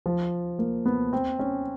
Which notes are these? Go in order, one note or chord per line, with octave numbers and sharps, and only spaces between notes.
F3
A#3
B3
C4
C#4